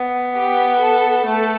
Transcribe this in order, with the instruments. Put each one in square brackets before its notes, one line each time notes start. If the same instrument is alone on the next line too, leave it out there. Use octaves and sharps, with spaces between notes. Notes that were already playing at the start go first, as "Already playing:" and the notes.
Already playing: [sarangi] B3
[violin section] G4
A4
[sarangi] A3 [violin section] A4